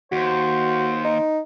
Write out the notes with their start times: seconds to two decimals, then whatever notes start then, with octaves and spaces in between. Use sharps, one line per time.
0.12 D#2 F#4 C5
1.05 D#4